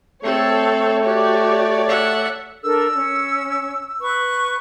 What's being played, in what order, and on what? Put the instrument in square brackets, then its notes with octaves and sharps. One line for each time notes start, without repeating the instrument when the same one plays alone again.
[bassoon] A3 [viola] C4 A4 [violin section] C#5
[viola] F#4 G4 [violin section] C#5 D5
[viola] E5 F#5
[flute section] D4 A4 A#4 [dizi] E6
[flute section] C#4
B4 C#6